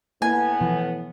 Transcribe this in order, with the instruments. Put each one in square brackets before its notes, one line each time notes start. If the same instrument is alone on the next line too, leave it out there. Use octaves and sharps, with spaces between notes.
[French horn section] A2 B3 [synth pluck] A#3 E4 [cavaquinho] G#5
[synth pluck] B2 E3 F3